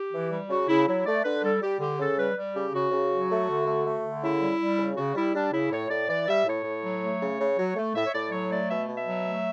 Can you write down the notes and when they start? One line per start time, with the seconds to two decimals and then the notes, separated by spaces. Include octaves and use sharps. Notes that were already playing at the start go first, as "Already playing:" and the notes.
Already playing: G4
0.13 E3
0.31 G3
0.49 C#3 F#4
0.68 C#3 E4
0.86 F#3 E4
1.05 A3 D5
1.24 D3 B4
1.42 G3 A4
1.61 G3 G4
1.79 D3 G4
1.98 C#3 A4
2.18 G3 B4
2.36 G3
2.54 C#3 G4
2.73 C#3 F#4
2.91 C#3
3.10 F#3
3.29 A3
3.48 D3
3.66 A3
3.85 A3
4.03 D3
4.21 C#3 E4
4.41 G3
4.60 G3
4.78 C#3
4.96 C#3 F#4
5.14 G3 E4
5.34 G3 D4
5.52 C#3 E4
5.71 A2 C#5
5.89 A2 D5
6.08 E3 D5
6.27 G3 E5
6.45 A2 C#5
6.63 A2
6.82 F#3
7.01 A3
7.20 C#3
7.38 C#3
7.57 F#3
7.76 A3
7.94 A2 E5
8.07 C#5
8.13 A2 D5
8.31 F#3 C#5
8.50 A3 D5
8.69 B2 E5
8.87 B2
8.94 E5
9.06 F#3
9.24 A3